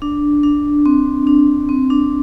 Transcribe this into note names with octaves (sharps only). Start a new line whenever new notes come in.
D4
D4
C4
D4
C4
D4